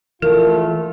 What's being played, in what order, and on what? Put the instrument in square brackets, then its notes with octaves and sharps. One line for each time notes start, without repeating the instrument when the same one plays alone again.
[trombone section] A#1 A3 F4 [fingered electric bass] E3 [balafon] A#4